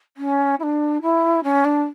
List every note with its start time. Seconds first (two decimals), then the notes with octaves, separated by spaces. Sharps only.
0.17 C#4
0.59 E4
0.63 D4
1.02 E4
1.44 C#4
1.65 D4